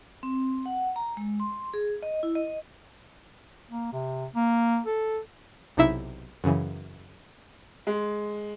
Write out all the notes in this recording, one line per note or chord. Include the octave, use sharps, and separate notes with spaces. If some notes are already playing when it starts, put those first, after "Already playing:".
C4
F#5
A#5
G#3
C6
G#4
D#5
E4
D#5
A#3
C3
A#3
A4
B1 C3 D#4 E4 E5
F#2 C#3 E3
G#3